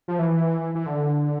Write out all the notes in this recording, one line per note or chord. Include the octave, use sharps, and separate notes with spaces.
F3
E3
E3
D3